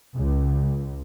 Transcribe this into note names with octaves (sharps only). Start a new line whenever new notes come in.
C#2